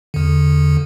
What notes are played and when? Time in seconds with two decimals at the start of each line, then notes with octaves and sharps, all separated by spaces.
0.14 E2 D3